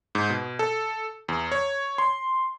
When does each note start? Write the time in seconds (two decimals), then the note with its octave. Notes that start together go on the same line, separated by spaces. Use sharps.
0.15 G#2
0.30 B2
0.59 A4
1.28 E2
1.52 C#5
1.98 C6